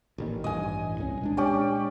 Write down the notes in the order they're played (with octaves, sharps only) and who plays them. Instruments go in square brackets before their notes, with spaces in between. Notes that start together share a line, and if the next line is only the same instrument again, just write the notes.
[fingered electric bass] A1 A#2 D#3
[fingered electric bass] A1 G2 E3 [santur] D#5 G#5
[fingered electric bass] C2 G3 C#4
A#2 G#3 D4
[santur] C#4 G4 D5